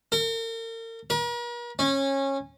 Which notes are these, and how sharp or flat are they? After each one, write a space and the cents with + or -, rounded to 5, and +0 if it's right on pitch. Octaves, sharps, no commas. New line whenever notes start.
A#4 -40
A#4 +45
C#4 -20